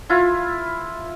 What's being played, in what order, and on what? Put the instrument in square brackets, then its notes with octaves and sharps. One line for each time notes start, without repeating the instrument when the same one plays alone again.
[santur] E4 F4